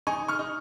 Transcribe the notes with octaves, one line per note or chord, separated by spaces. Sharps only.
D#4 G#5 C#6
C#6 F6
D#4